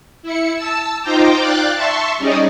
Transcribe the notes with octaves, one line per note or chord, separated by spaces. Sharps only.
E4 C#7
A5 E6
D#4 F4 C5 G5 A#5 D6
D5 F5 G5 D6 F#6 A6
E5 A5 C6 C#6
G3 C#4 D#4 G#4 D5 D#5